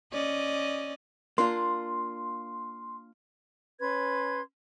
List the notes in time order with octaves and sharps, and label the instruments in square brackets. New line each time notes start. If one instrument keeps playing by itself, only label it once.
[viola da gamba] C#4 D5 D#5
[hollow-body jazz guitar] A#3 D4 F4 [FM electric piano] C6
[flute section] C#4 B4 C6 G#6